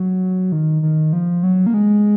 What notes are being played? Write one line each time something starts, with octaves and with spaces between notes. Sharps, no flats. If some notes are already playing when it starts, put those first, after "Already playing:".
Already playing: F#3
D#3
D#3
F3
F#3
A#3
G#3